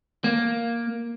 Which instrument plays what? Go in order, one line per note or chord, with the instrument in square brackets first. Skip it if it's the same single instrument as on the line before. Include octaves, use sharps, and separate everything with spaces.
[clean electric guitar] A#3